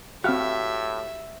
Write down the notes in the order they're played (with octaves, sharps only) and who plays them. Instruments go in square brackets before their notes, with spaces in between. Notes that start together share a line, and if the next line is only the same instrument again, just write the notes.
[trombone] A2 [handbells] C4 F6 F#6 [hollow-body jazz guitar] F#4 G4 F5 [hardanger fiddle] E5